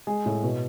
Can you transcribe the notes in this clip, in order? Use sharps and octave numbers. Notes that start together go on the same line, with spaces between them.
G#3 G#4
A2
B2